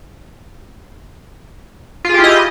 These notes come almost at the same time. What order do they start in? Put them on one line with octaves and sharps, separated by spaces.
F4 G#4 G4 E4 D#5